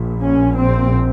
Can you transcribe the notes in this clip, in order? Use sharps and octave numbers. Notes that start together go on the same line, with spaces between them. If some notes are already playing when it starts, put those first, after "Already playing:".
Already playing: A#1 A#2
C#4
C4